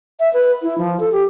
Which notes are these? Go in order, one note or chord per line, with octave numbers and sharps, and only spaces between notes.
E5
B4
E4
F3
A4
G4